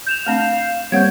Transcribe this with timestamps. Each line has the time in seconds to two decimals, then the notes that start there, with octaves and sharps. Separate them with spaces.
0.07 G6 E7 F7
0.27 A3 C4 D4 F5
0.92 G3 A#3 C4 C#5 F5 F#5 G6 G#6